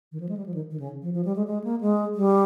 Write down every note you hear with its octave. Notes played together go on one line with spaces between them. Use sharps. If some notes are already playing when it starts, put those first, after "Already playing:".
D#3
F3
G#3
G3
F3
D#3
D#3
C#3
F3
F3
G3
G#3
G#3
A#3
G#3
G3